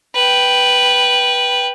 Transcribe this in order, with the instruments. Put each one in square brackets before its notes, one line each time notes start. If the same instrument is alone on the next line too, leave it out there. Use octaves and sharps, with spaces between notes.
[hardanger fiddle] B4 G5